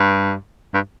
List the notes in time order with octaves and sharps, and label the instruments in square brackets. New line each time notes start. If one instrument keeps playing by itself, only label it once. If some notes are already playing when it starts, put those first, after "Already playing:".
Already playing: [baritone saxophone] G2
G2